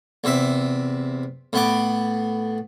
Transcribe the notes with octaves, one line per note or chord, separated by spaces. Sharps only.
E2 C3 E5
A2 B3 D6